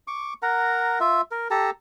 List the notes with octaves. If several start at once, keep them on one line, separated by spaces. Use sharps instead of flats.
C#6 D6
A#4 F#5 A#5
F4 E5
A#4
G4 A4 A5 A#5